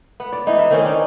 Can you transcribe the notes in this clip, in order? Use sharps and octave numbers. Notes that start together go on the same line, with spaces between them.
B3
D5
E3 B3 D#4
E5
D#3 C4 C#4
D4 D#4